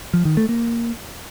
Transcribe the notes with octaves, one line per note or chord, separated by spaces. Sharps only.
F3
D#3
A3
A#3